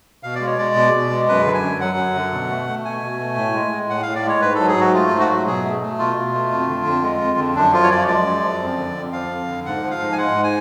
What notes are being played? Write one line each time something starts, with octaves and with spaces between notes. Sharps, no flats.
B2 F5
D5
G#3
C#5
G#3 D5
B2
B2
G#3
F#2 B4
D3
G#5
F#2
F#3 F#5
F#2
D3
B2
A3
A3
B2 G#5
B2
A3
A2
G#3
G#3
A2 F#5
A2 F5
D5
G#3 C#5
G#2 B4
A4
F#3
G#4
G#2 F#4
A3 F4
G#2
F#4
F#3
B2 G#4
A3
A3
B2 F4
B2
A3
F2
D3
F2
G#3
F2
D3
F#2 D4
F3 F4
C#5
F#2 D5
G#3 D5
F#2
F3
F2
D3
F2
F3 F5
F2
D3
G#2 F#5
F3
F5
G#2
G#5
G#3 F#5
G#2
G#5